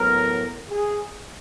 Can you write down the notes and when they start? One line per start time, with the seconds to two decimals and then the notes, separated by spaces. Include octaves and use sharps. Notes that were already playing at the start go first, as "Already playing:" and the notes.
Already playing: A2 F#3 B3 A#4
0.71 G#4